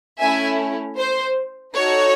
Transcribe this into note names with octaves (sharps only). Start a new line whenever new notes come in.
A3 C#4 E4 E5 G#5
C5
D#4 F#4 A4 C#5